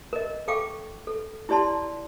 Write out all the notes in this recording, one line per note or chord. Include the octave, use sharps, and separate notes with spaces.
A#4 D#5
A4 F5 G5 C#6 D6
A4
E4 G4 D5 A5 C6